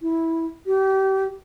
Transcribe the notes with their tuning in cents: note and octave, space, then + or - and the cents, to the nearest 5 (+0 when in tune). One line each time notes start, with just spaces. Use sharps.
E4 -10
G4 -30